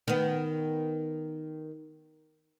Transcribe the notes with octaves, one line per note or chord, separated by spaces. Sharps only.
D#3 B3